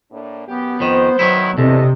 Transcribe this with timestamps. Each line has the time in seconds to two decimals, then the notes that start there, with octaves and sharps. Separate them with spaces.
0.12 A2 A#3 D4
0.48 F#2 B3 G4
0.80 F2 D#3 C5
1.19 D#3 F#3 B3 E4
1.58 E2 C3 D4 A4 D#5